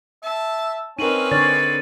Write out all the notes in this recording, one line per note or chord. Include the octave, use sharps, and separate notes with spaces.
E5 A5
C4 C#4 D#4 A#4 B4 D#7 F#7
D3 C#5 D5 A6